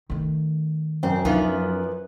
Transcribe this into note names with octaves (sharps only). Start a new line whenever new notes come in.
D#3 A3
F#2 C4
E3 F3 B3 D4 D#4